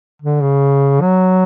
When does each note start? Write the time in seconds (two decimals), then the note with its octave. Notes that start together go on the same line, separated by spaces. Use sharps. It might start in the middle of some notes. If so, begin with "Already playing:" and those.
0.22 D3
0.41 C#3
1.01 F#3